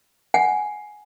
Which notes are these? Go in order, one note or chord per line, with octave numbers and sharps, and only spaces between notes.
F#5 G#5